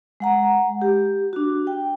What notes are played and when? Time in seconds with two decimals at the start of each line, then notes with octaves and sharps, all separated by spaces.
0.20 G#3 F#5 A#5
0.82 G4
1.33 D4 F#4
1.67 G5